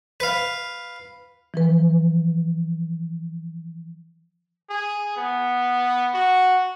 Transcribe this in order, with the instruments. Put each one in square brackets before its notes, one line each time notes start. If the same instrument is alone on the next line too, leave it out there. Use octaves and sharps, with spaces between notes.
[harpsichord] B4 F5
[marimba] E3 F3 B4
[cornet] G#4
B3
F#4